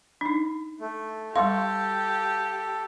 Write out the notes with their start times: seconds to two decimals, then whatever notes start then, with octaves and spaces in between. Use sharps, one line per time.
0.21 D4 D#4
0.80 A3
1.36 G3 G4 A4 F5 C6 C#6